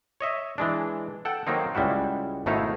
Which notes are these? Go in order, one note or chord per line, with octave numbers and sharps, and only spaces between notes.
C#5 D#5 E5
E3 G#3 D4
A4 F#5 G5
D#3 F#3 A#3 C4 D#4
C#2 G3 G#3 E4 F#4
G#1 B2 A3 D#4 E4 F5